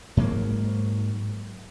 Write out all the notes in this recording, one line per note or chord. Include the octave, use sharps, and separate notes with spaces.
G#2 F#3 A#3